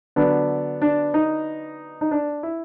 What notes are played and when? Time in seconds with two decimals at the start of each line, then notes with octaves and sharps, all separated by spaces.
0.16 D3 F#3 B3 D4
0.82 D4
1.14 D#4
2.01 D#4
2.11 D4
2.43 E4